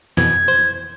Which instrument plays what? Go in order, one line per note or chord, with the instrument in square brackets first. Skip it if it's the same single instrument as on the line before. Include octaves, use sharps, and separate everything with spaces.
[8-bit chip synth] F2 B2 E3 [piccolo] G#6
[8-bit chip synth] C5